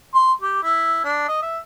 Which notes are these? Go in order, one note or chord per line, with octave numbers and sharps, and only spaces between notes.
C6
G4
E4
D4
D#5
E5